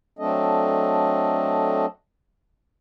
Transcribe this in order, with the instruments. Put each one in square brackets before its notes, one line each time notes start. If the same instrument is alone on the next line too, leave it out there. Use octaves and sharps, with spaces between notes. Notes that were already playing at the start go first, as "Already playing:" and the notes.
[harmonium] F#3 A3 C4 D4 A4 D#5